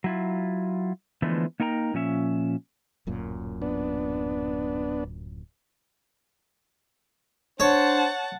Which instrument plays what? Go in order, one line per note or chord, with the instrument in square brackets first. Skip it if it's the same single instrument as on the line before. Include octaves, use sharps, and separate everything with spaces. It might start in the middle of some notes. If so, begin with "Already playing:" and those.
[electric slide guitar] F#3 E4 F4
D3 E3 F3 G#3 A3 B3
A#3 D#4 A#4 G5 A#5
A#2 F3 C#4 E5
[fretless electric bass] D1 F#2 A#2
[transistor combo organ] B3 D4
[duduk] D4 [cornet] C5 [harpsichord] C#5 [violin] F#5 A5